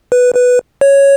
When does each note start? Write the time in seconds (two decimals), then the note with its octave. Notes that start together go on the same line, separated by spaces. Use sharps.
0.12 B4
0.35 B4
0.81 C#5